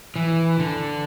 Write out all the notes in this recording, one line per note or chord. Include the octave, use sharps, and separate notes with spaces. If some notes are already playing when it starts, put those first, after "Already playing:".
E3
D3